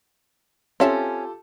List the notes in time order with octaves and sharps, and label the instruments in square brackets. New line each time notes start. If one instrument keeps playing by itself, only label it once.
[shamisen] C4 E5 A5 [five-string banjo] C#4 [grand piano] F4 G4 A4